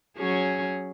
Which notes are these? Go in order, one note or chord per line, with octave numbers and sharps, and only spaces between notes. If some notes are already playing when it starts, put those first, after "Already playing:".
F#3 C#4 G#4